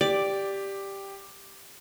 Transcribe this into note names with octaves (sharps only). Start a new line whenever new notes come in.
G4 D5